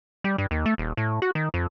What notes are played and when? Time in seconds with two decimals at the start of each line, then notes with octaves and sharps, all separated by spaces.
0.24 G3
0.38 G2
0.51 D#2
0.66 A3
0.78 D#1
0.97 A2
1.22 F#4
1.35 D#3
1.54 F2